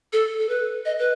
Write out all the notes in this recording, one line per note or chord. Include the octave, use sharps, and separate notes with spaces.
A4
A4
B4
D#5
B4